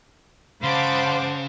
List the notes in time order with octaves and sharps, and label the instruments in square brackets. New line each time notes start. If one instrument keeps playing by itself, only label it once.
[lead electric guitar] C#3 [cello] C5 F#5 [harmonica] F5 B5 C6 [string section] A5 D6